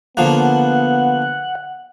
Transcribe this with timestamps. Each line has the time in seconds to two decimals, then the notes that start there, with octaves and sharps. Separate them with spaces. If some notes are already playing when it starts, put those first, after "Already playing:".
0.17 D3 F3 A#3 B3 F#5